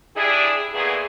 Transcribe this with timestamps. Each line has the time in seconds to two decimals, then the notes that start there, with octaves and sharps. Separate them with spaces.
0.16 D4 E4 G4 G#4
0.73 A#2 E3 A3 B3 G#4